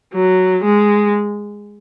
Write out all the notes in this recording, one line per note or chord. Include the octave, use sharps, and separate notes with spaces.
F#3
G#3